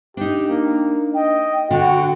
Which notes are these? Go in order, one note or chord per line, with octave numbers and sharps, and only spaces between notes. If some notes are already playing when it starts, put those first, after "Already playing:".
D4 D#4 G4
A#3
D#5 G5
D3 F#4 G5